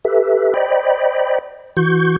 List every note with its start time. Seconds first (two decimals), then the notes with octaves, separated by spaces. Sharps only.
0.05 G4 A4 B4 E5
0.54 C5 D5 D#5 G5 B5
1.77 E3 F#4 C#6 G6